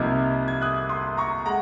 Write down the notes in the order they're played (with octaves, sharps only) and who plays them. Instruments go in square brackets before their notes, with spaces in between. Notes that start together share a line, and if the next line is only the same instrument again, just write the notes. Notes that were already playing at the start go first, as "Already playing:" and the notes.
Already playing: [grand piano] C2 C3 F3 A#3 D#4 F6 G#6
G#6
D#6 F#6
C6 D#6
A#5 C#6
G#3 F#5 A#5